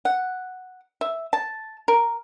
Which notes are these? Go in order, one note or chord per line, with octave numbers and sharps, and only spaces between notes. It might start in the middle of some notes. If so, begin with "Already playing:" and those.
F#5
E5
A5
A#4